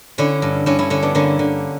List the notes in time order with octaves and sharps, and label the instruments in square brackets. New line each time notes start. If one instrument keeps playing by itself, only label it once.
[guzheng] D3 C#4 E4
G2
G2 C#4 E4
C#4 E4
D3 C#4 E4
B3 D4
D3 A#3 C#4
D3